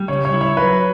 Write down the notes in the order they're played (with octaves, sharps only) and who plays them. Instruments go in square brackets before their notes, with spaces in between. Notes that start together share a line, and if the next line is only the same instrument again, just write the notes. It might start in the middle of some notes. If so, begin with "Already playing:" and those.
Already playing: [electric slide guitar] G3
[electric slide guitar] C#3 [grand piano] C#5
[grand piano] C#5
[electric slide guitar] E4
[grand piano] C#5
[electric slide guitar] F#3 [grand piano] B4